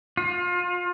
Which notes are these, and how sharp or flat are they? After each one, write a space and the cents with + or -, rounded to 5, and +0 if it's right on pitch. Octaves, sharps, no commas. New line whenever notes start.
F4 +30